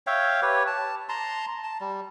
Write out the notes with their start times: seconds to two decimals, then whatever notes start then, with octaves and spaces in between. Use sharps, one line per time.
0.07 C#5 E5 F5 G5
0.42 G4 B4 C#5
0.67 A5
1.09 A5 A#5 C6
1.64 A5
1.81 G3